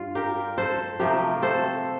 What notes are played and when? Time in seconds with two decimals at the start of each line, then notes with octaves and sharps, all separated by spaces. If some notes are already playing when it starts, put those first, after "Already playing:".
Already playing: G2 F4
0.15 G4 A#4
0.58 A4 C5
1.00 C3 F3 A3 G4 A#4
1.42 A4 C5